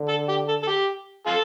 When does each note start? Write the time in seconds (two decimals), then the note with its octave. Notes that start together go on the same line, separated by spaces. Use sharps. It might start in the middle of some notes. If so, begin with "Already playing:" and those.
Already playing: D3
0.08 A4
0.28 G4
0.48 A4
0.63 A4
0.67 G4
1.27 F4 A4